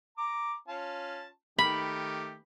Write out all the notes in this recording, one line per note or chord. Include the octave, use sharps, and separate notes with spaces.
A#5 D6
C#4 F4 A5
D#3 A3 G4 B5